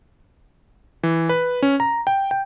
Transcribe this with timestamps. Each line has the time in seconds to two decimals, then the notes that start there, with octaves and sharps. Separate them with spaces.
1.03 E3
1.29 B4
1.62 C#4
1.80 A#5
2.07 G5
2.31 G5